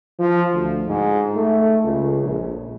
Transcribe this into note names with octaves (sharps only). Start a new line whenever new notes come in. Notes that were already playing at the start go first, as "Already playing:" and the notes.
F3
D2
G#2
A3
C#2
A#1